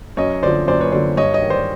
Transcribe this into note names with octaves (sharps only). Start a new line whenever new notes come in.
F#2 C#5 D#5
D3 F3 C5 D5
F#2 C5 D5
B4 C#5
D3 F3 C5 D5
G2 C#5 D#5
C#5 D#5
D#3
C5 D5